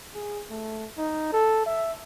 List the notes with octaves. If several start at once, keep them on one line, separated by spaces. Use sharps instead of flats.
G#4
A3
D#4
A4
E5